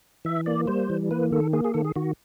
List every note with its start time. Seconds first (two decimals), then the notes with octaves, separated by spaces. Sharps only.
0.25 E3 E5
0.46 A#3 D5
0.67 G3 C5
0.90 E3
1.11 A#3 B4
1.32 D#3 A4
1.53 A#3 G#4
1.64 G#4
1.74 D#3 A4
1.84 G#4
1.96 D#3 F#4